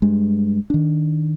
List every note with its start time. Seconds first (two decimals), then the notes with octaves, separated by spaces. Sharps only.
0.02 G2 G#3
0.70 D#3 D4